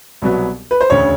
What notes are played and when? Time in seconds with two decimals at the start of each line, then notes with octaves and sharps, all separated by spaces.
0.22 C2 B2 F#3 B3
0.71 B4
0.81 C5
0.90 E1 D2 C#3 C#5